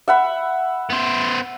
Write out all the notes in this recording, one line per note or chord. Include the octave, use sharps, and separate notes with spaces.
E5 F#5 B5
B3 C5